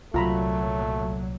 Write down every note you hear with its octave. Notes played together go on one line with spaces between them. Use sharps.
C2 A#2 F#3 A3 F4 A#5 B5